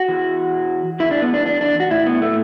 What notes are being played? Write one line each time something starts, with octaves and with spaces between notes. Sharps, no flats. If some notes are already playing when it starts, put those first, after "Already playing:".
Already playing: F#4
E2 E3
E2 E3 E4
D4
B3
D4
D4
D4
F#4
A2 E3 E4
B3
A3